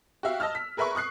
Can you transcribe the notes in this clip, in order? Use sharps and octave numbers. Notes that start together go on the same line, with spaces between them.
F#4 G4 E5 F5
D#5 A5 E6 F6
B6
G#4 A#4 B4 E5 B5 C#6
C#6 D#6 F#6 C7